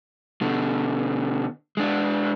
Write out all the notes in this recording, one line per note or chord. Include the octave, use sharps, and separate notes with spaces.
B2 D3
G#3 D4